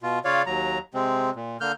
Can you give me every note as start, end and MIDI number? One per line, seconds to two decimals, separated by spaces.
0.03 0.19 47
0.03 0.19 65
0.25 0.42 49
0.25 0.42 65
0.25 0.42 73
0.25 0.42 74
0.25 0.42 77
0.46 0.78 39
0.46 0.78 54
0.46 0.78 82
0.94 1.30 48
0.94 1.30 56
0.94 1.30 60
1.36 1.57 46
1.61 1.72 50
1.61 1.72 58
1.61 1.72 89
1.61 1.72 91